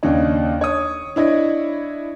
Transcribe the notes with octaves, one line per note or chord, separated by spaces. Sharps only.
D#2 C#3 D4 D#4 C#5
C#5 D#6
D4 E4 C#5 D#5